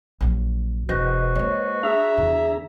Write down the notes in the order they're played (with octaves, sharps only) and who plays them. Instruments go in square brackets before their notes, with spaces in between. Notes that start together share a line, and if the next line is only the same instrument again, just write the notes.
[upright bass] A#1 F#3
[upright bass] E1 [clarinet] F#4 [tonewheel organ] B4 C5 D#5
[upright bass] G#3 A#3 [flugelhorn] C#5
[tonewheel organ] D4 G#4 A#5 [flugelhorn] E5
[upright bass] E2 D3